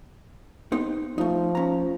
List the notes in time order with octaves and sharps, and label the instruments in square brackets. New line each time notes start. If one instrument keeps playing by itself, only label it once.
[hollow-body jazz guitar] B3 C4 D#4
[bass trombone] F3 [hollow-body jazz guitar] A3 D#4
[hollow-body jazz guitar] C#4 A#5